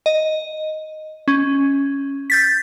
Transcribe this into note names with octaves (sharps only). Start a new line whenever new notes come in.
D#5
C#4
G6 A6 B6